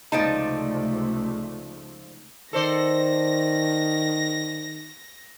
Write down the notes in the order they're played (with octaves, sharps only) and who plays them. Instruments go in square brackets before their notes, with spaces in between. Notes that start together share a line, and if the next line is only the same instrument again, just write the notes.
[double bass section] C#2 C3 A3 [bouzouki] F3 D5 A5 [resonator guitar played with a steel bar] D#4
[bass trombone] D#3 [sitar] A4 C5 D5 [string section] A#6